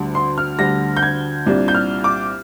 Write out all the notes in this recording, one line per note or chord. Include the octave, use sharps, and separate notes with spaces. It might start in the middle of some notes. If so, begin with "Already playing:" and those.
Already playing: D2 D3 G3
C6
F6
D2 D3 G3 A#6
G6
G#6
C2 A#2 G3 D4
G6
F6
D6